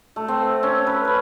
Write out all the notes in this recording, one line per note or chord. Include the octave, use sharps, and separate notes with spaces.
A3
C4
C#4
B4
B4